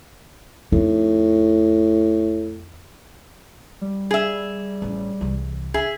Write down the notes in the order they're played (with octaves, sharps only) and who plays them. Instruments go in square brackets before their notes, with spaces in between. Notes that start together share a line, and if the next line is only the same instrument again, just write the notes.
[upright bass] F2 D#4 [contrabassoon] A2
[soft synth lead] G3
[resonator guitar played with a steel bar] G#4 E5
[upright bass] A1 C#4
C2 E3
[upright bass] D3 [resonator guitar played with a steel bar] G#4 [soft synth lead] E5